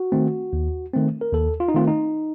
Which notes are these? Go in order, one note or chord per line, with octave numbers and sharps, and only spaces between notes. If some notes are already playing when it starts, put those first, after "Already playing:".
Already playing: F#4
D#3 A3 C4
D#2
D#3 A3 C4
A#4
D#2 A4
F4
D#4
D#3 A3 C4 F4
D#4